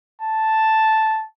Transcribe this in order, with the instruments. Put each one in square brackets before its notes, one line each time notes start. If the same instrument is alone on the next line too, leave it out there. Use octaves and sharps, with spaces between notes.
[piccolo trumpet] A5